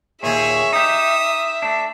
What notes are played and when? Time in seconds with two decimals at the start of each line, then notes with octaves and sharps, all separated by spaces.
0.23 D#2 A#2 G#4 C#5 E5
0.73 D#4 G4 D#6
1.62 A3 D4